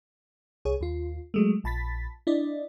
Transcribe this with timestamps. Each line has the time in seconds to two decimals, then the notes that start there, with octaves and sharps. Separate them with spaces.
0.65 C2 G#4 C#5
0.81 D#2 F4
1.34 F#3 G#3 A3
1.64 A#1 A5 B5 A6 B6
2.27 D4 E4 D5 D#5